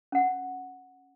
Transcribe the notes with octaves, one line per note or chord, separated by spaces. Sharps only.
C#4 F#5